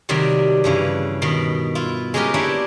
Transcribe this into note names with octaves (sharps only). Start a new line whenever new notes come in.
C3 D#3 F#3 G3
G2 C#3 E3
B2 D#3
E4 F4
G#3 C#4 D#4 G4 A#4 B4
A#3 D4 E4 G4 B4 C#5